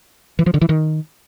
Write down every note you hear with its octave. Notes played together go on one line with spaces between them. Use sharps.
E3
F3
D3
E3
D#3